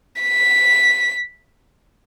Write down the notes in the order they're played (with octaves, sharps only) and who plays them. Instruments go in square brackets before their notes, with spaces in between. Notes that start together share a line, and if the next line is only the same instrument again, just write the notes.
[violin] B6